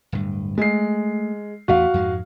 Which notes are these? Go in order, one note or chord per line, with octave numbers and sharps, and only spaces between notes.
D1 G2
G#3 A3 C7
A1 E2 A3 F#4 F5
F2 G#2 G#3